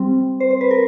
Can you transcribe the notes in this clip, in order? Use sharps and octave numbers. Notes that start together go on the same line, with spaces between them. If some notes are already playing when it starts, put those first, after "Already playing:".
Already playing: G3 C4
C5
C5
B4
A#4